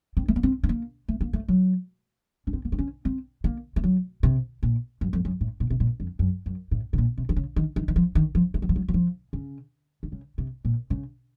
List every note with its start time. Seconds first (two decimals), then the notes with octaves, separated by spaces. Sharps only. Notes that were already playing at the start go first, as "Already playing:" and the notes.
0.17 C4
0.28 A3
0.36 A#3
0.43 C4
0.63 C4
0.69 A#3
1.08 A3
1.21 A#3
1.33 A3
1.48 F#3
2.47 C#4
2.53 C4
2.65 A#3
2.72 C4
2.79 C#4
3.05 C4
3.44 A#3
3.76 A3
3.84 F#3
4.23 C3
4.63 A#2
5.01 F#2
5.13 F2
5.25 F#2
5.41 A2
5.60 A#2
5.70 C3
5.80 A#2
6.00 F2
6.19 F#2
6.46 F#2
6.71 A2
6.93 C3
6.98 A#2
7.18 C3
7.29 D#3
7.36 C#3
7.56 D#3
7.76 D#3
7.88 D#3
7.96 F3
8.15 D#3
8.35 F3
8.54 A3
8.62 F#3
8.69 F3
8.76 F#3
8.88 F#3
8.94 F3
9.33 C#3
10.03 D#3
10.12 C#3
10.38 C3
10.65 A#2
10.90 C#3